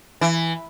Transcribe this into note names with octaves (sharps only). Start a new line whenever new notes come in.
E3